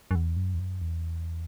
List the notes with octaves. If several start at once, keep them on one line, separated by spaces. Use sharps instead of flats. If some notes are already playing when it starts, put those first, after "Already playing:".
F#2
E2
F#2
E2
F#2
E2